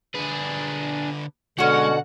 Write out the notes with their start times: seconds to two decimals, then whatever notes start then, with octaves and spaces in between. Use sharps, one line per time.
0.15 D3 D4 G#4 B4
1.59 B2 D3 G#3 C#4 F#4 F#5